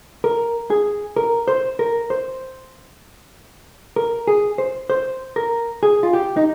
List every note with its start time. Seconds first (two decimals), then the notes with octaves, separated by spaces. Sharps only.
0.24 A#4
0.70 G#4
1.16 A#4
1.48 C5
1.79 A#4
2.10 C5
3.96 A#4
4.27 G#4
4.58 C5
4.90 C5
5.36 A#4
5.83 G#4
6.03 F4
6.13 G4
6.37 D#4